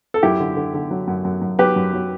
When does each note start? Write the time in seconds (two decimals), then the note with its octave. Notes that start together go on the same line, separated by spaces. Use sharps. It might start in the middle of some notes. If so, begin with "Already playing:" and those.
0.14 A4
0.23 F#2 E4 G4
0.40 D3
0.56 D3
0.74 D3
0.91 F#3
1.08 F#2
1.25 F#2
1.42 F#2
1.59 F#3 G4 B4
1.76 F#2
1.93 F#3